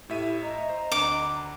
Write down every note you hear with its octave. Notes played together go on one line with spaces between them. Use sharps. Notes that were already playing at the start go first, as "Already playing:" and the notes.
A2 E4 G4 E5 D#7
D#5 A#5
C5
D2 D4 D6